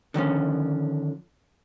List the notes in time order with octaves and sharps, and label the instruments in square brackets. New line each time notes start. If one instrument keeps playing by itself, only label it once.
[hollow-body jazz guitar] D3 D#3 F3 C#4